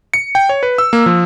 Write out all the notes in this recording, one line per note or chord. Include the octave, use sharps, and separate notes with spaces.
C#7
G5
C#5
B4
E6
A#3
F3